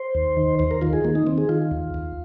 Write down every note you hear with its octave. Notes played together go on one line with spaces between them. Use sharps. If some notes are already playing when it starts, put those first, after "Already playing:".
Already playing: C5
D#2
D#3
D#2 C5
A#4
D#3 F4
G#4
D#3 A#3
D#4
D#3 C4
G#4
D#3 F4
D#2
D#2